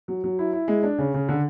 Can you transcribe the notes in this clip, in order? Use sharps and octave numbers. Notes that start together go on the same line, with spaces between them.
F#3
F#3
E4
E4
G#3
D4
C#3
C#3
D3